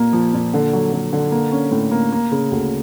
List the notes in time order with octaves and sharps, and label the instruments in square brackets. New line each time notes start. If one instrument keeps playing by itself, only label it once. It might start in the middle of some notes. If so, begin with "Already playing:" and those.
Already playing: [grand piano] A#2 A#3
F3
A#2
D3
F#3
D3
D3
A#3
C#4
A2
A#3
A#3
C#3
D2